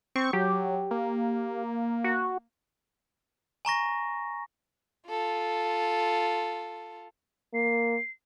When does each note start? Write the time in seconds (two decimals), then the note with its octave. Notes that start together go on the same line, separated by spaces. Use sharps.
0.16 C4 C#6
0.33 F#3 G4
0.91 A#3
2.04 F#4
3.65 G#5 A#5 C#6 A#6
5.08 F4 A4
7.54 A#3 C7